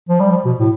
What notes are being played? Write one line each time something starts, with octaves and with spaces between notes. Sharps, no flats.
F3
G3
F3
B2
A2